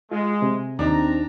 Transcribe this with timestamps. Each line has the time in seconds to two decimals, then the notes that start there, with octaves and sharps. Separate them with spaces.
0.12 G#3 F4
0.42 C3
0.79 D#2 C4 D4 D#4 A#5